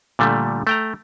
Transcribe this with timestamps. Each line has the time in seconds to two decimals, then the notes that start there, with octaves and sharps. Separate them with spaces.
0.19 A#2 D3 G3 A3
0.67 A3 G5 A#5